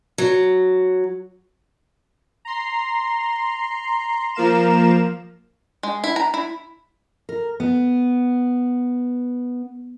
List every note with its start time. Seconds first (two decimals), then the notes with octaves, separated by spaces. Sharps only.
0.18 F#3
2.45 A#5 C6
4.34 F3 A#3 F5 A#5 E7
5.83 G#3
6.04 E4
6.16 A#5
6.34 E4
7.29 A#4
7.60 B3